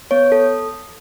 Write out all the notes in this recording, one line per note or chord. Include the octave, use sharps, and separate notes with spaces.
B3 C#5
A4